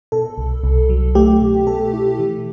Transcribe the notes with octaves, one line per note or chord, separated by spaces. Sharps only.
B2 A4
C2
C2
F#3
A3 G4
B2
B2 A4
E4
E3